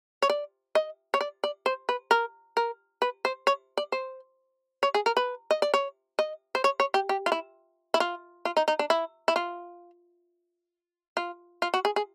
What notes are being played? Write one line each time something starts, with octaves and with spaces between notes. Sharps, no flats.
C#5
D5
D#5
C#5
D5
D5
C5
B4
A#4
A#4
B4
C5
C#5
D5
C5
C#5
G#4
A#4
B4
D#5
D5
C#5
D#5
C5
C#5
C#5
G4
G4
F4
E4
E4
F4
F4
D#4
D#4
D4
E4
E4
F4
F4
F4
F#4
G#4
G#4